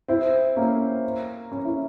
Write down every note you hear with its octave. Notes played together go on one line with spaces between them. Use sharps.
C4 E4
A#3 C#4
C#4
E4